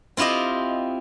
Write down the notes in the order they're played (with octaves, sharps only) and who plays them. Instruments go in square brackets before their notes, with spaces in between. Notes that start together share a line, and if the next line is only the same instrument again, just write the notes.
[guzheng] C4 E4 F4 G4 D#5